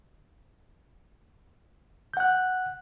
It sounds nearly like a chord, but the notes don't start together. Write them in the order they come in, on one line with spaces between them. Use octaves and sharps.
G6 F#5 F#6